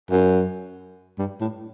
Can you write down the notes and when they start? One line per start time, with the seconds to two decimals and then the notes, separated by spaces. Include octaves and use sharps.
0.11 F#2
1.19 G2
1.41 A2